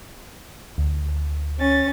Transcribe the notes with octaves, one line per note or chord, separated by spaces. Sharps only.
D2
C#4 A6